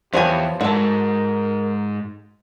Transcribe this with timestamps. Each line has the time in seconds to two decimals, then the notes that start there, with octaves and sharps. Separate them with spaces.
0.13 E2 F3 G4 C#5 G#5
0.61 G#2 F#4 A4 A#4